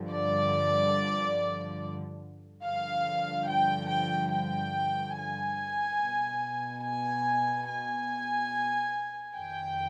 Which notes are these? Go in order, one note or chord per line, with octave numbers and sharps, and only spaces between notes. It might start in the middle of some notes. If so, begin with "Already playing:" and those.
Already playing: G2 D3 F3
D5
G2 D3 F3 F5
G5
G5
G5
G#5
B2
G#5
G#5
F2 D#3 G5